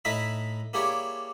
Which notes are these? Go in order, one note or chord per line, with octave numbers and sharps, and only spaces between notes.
A2 D#4 E4 D#5 E5 B5
A#3 E4 G4 G#4 C#5 D5